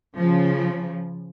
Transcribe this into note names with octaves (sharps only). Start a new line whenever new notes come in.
C#3 F3